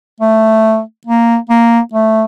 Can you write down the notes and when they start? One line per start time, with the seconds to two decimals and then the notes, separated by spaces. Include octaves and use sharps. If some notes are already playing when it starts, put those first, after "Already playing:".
0.20 A3
1.07 A#3
1.50 A#3
1.93 A3